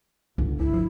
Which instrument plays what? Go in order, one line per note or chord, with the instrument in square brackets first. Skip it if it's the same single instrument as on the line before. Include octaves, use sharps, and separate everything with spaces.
[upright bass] G1 [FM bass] C#2
[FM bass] C#2 [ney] E4
[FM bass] F3